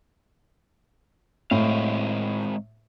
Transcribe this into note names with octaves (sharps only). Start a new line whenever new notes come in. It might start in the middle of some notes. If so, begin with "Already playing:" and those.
A2 G#3 C4 F5